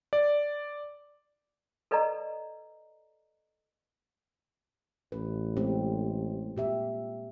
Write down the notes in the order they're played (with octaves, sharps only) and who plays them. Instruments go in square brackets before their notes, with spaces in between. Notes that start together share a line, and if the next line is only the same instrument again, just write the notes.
[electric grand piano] D5
[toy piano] A4 B4 D5 D#5 A#5
[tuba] A1 [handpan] B4
[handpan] G#3 C4 G4
A#2 G4 E5